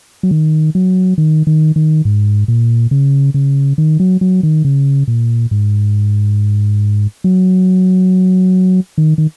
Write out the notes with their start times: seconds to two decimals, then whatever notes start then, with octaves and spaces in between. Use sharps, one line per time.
0.23 F#3
0.31 D#3
0.75 F#3
1.18 D#3
1.47 D#3
1.76 D#3
2.05 G#2
2.48 A#2
2.91 C#3
3.34 C#3
3.78 D#3
4.00 F#3
4.21 F#3
4.43 D#3
4.65 C#3
5.08 A#2
5.51 G#2
7.24 F#3
8.98 D#3
9.18 D#3